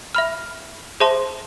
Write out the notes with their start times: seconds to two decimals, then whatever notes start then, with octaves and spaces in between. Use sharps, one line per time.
0.15 E5 B5 F6
1.00 G#4 C5 E5 A5 C6